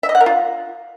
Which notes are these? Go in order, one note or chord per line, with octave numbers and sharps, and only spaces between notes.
E5
D#5
F#5
A#4
F4